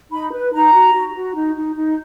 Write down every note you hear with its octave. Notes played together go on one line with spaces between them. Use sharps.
D#4 B5
B4
D#4 A#5
F#4
F#4
F#4
D#4
D#4
D#4